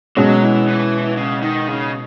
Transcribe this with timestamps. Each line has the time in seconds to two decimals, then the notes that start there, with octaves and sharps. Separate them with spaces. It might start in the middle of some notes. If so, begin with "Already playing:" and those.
0.17 B2 F#3 G#3 C#4
0.43 E3
0.68 E3
1.17 C#3
1.42 D#3
1.68 C#3